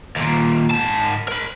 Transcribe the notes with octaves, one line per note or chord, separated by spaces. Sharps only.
D#2 A#2
G#2 A5
A#4 B5